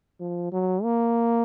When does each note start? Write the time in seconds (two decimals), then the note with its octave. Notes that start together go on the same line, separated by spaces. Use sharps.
0.21 F3
0.53 F#3
0.83 A#3